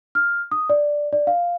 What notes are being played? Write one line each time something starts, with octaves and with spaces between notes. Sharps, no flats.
F6
D#6
D5
D5
F5